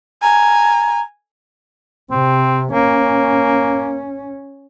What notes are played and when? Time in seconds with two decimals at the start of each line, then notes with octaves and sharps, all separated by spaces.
0.23 G#5 A#5
2.11 C3 C4
2.73 A#3 C#4